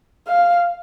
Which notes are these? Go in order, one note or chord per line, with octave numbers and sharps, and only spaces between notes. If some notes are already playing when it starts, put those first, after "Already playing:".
F5